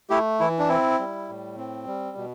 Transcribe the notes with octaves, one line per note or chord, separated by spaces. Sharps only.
A3 E4 G4
E3 E4
D4
C4 E4
G3
A2
C4
G3
B2